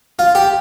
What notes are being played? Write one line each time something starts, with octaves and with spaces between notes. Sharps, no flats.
F4
G4